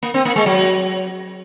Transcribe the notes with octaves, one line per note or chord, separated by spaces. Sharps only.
A#3
C4
A#3
G#3
F#3